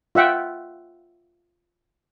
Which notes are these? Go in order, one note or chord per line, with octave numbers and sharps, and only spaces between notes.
F4 E5 F#5 G5